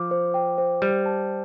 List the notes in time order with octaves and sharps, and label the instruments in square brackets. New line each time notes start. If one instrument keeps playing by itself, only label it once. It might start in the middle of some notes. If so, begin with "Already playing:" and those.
Already playing: [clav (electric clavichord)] F3 [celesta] D6
[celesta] C5
G5
C5
[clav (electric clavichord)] G3 [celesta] C5
[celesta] A5